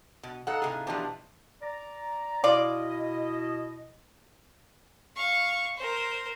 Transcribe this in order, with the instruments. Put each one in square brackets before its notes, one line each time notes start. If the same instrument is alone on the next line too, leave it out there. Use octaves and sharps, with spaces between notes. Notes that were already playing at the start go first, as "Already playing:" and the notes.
[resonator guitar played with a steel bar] B2
[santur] D#4 F5 [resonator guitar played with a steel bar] A4 F#5
[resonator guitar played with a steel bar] A2 C3 G#4
[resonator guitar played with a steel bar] B2 E3 F3 [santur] D4 G4
[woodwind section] D5 A#5
[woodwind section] B2 E4 D#5 [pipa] F4 D5
[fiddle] F5 C#6
A#4 C5